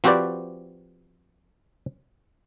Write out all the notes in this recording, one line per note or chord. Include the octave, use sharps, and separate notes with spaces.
F3 C4 F#4 G4 B4 D5